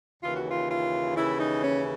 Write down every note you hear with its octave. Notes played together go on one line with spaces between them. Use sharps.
D#2 C#3 E3 F4
F#4
F4
F4
D#2 C#3 E3 E4
D#4
C#4